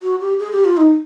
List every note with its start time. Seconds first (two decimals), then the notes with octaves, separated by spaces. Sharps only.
0.02 F#4
0.21 G4
0.39 G#4
0.53 G4
0.65 F4
0.77 D#4